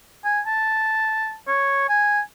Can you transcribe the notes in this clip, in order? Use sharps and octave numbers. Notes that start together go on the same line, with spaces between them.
G#5
A5
C#5
G#5